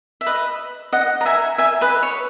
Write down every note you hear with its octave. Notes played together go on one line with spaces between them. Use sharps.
E5
B4 D#5
D#5 F#5
A#5
E5 G#5
E5 G#5
B4 D#5
C#5